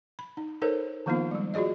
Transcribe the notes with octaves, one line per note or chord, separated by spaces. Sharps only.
B5
D#4
D#4 A4 A#4 C5 C#5
D#3 F3 A#3 B3 D#4 F4
G3 G#3
F4 F#4 G#4 D5 D#5